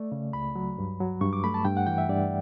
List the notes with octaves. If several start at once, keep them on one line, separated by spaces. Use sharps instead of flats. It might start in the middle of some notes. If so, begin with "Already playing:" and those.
Already playing: A3 D5
C#3
C#2 B5
F#3
G2
F#3
G2 C#6
D6
A3 B5
A5
G2 G5
F#5
E3 G5
E5
G2 D5